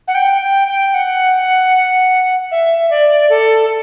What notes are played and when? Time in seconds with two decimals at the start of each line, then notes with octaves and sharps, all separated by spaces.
0.08 F#5
0.15 G5
0.41 G5
0.68 G5
0.94 F#5
2.51 E5
2.91 D5
3.30 A4